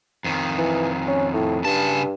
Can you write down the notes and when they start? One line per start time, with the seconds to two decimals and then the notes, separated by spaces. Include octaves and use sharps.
0.24 F2 D#3
0.58 E3
1.08 C#4
1.34 A2
1.65 G2 C#3 A5